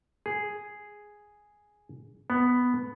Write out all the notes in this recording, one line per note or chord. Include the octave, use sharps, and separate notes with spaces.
G#4
B3